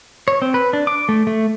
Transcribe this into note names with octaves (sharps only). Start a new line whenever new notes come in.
C#5
C4
B4
D4
D6
A3
A3